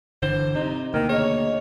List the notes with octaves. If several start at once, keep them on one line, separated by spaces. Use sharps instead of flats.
G1 D3 E3 C5 G7
C3 D#4
D2 B2 D#3 A#3 F6
G#4 C#5 D#5